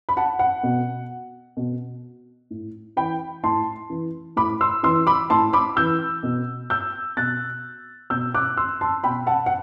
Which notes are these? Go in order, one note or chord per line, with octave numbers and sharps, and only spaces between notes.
B5
F#5 A5
F#5
B2
B2
A2
E3 G5 B5
A2 A5 C6
E3
A2 B5 D6
C6 E6
E3 C6 E6
B5 D6
A2 A5 C6
B5 D6
E3 E6 G6
B2
E6 G6
B2 F#6 A6
B2 E6 G6
D6 F#6
C6 E6
A5 C6
B2 G5 B5
F#5 A5
F#5